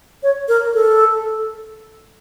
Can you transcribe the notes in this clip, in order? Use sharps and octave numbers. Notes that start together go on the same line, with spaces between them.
C#5
A#4
A4